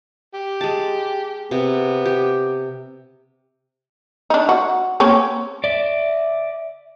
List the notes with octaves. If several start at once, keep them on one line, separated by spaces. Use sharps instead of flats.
G4
G#3 A5
C3 B3
G4
D4 D#4
F#4
A#3 C4 C#4
D5 E5